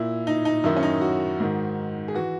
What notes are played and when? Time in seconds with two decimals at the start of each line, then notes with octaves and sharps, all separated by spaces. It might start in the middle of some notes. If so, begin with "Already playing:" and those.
Already playing: A#2 E4
0.27 D#4
0.45 D#4
0.64 F#2 D#3 E4
0.76 C#4
0.83 D#4
1.01 F#4
1.40 G#2 D#3
2.08 G#4
2.14 E3 F#4